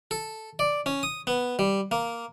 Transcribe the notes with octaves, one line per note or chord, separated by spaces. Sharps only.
A4
D5
C#4
D#6
B3
G3
A#3